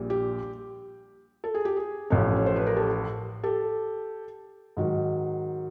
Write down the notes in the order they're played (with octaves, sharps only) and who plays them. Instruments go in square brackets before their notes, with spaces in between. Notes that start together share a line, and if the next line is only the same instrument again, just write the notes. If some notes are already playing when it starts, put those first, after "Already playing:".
Already playing: [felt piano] A#1 A#2 G3
G4
A4
G#4
G4
G#4
A1 A2 F3 A3 C#4
C#5
C5
B4
A#4
G4 A4
G4 A4
G#2 D#3 F#3